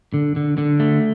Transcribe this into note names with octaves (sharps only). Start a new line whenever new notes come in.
D3
D3
D3
A3